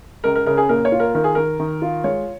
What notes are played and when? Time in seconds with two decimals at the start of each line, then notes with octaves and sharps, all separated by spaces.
0.24 C#2 A#4
0.35 A#4
0.46 C#3 A#4
0.57 G#4
0.69 A#2 A#4
0.85 C#5
0.92 F4
1.00 A#4
1.14 D#3 A#4
1.24 G#4
1.35 D#3 A#4
1.59 D#3
1.82 F4
2.04 G#3 C#5